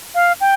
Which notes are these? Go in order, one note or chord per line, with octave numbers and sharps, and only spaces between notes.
F5
G5